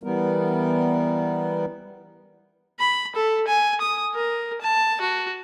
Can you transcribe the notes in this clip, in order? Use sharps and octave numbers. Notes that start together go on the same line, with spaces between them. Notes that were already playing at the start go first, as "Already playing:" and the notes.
E3 G3 B3 A#4
B5
A4
G#5
D#6
A#4
A5
F#4